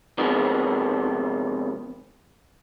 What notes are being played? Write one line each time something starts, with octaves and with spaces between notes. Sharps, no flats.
C3 D#3 F3 G#3 B3